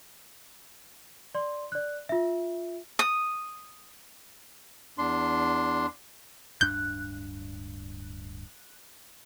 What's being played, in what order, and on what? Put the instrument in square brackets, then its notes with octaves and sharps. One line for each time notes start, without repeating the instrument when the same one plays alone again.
[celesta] D5 C6
D5 F#6
F4 E5
[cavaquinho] D#6
[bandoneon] E2 D4 C6
[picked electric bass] D1 G2 D4 [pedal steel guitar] F#6 [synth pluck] G6